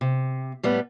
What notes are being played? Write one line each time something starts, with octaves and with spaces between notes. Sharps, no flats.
C3
A2 G3 A3 B3